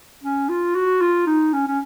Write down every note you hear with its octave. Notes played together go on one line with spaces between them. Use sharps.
C#4
F4
F#4
F4
D#4
C#4
C#4